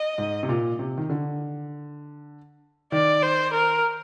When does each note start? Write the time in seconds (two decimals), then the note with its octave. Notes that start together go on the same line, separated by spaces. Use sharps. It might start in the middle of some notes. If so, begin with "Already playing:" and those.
Already playing: D#5
0.18 G#2
0.43 C3
0.49 A#2
0.79 C3
0.98 D#3
1.10 D3
2.92 D#3 D5
3.22 C5
3.53 A#4